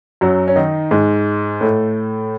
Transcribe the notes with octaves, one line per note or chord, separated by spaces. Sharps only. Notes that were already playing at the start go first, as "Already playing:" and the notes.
F#2 F#3
C#4
D#3 D#4
G#2 G#3
A2 A3